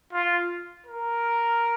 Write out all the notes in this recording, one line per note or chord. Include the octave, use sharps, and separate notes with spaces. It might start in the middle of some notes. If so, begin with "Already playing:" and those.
F4
A#4